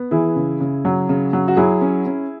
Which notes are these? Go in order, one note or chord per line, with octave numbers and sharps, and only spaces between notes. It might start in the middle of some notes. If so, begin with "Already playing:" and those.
Already playing: B3
E3 E4 G#4
C#3
C#3
F#3
C#3
F#3
F#4
F#3 E4 G#4
C#4
C#4